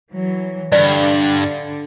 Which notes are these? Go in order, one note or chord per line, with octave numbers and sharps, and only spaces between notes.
E3 F#3
G2 D3 D5